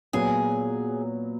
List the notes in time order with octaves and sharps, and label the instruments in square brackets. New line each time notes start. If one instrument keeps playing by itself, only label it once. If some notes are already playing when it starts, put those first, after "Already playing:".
[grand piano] A#2 F#3 B3 [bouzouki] G#4